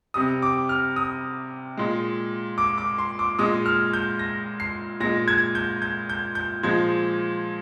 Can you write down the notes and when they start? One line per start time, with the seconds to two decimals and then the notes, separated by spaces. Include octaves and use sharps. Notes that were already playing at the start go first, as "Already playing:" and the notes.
0.14 C3 G3 D#6
0.42 D6
0.69 F6
0.96 D#6
1.77 A#2 G#3
2.58 D6
2.78 D6
2.98 C6
3.19 D6
3.39 A#2 G#3 D#6
3.66 F6
3.93 G6
4.19 A#6
4.60 C7
5.00 A#2 G#3 A#6
5.28 G#6
5.55 G6
5.82 G6
6.09 G6
6.35 G6
6.63 A#2 F3 G#3 G#6